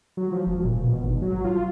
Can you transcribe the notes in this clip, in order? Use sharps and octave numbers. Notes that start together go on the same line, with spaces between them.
F#3
F3
E1
A#2
B2
G#1
F#3
F4